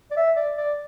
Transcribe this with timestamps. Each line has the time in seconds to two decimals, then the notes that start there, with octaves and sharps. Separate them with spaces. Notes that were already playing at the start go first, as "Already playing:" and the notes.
0.11 D5
0.17 E5
0.37 D5
0.57 D5